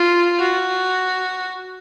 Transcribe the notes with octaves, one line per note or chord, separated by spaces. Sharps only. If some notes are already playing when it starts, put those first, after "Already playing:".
Already playing: F4
F#4